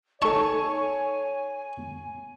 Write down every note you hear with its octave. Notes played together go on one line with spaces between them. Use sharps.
D#4 A4 C#5 G#5 A5 C#6